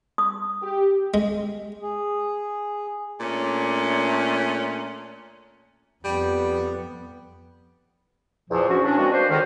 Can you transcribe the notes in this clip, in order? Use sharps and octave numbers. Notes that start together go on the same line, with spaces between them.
D#6
G4
G#3
G#4
A#2 A3 C#4 D4
F2 G3 B3
E2 A#2 E3 F3
E3 B3 C#4 D4 F#4
C#4 D4
A#2 F3 G#3 C4 F#4
D4 B4 C5
C#2 D3 D#3